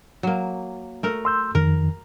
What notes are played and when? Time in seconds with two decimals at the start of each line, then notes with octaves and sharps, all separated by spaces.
0.23 F#3 A#3
1.03 A3 A#4
1.25 C6 E6 G6
1.55 F2 D#3 A#4